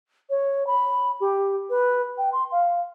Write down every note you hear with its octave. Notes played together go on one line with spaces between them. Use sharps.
C#5
B5
G4
B4
G5
C6
F5